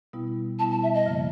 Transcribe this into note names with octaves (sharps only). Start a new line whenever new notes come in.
B2 G3 B3 E4
B2 G3 B3 E4 A5
A5
E5
D#5
F#2 C#3 F3 A#3